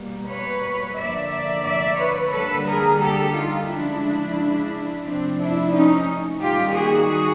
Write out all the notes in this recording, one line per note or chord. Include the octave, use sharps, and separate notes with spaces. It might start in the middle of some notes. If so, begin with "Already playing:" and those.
Already playing: B2 G3 A#3
B4 C#5
D3 F3 A#3 D5 E5
D5 E5
D5 E5
B4 C#5
D3 G3 A#3 A4 B4
G#4 A#4
G4 A4
D#4 F4
C#3 F3 G#3 D4 E4
C3 F3 A3 C4 D4
D4 E4
C#4 D#4
D#3 G3 A#3 F4 G4
F#4 G#4